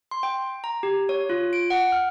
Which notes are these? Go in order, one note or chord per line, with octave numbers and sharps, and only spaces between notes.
C6
G5
A#5
G4
C#5
F4
D7
F#5
F6